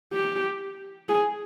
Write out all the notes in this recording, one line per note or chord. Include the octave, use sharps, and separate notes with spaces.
G4
G#4